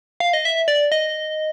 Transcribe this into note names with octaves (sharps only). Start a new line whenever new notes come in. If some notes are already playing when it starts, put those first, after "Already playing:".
F5
D#5
E5
D5
D#5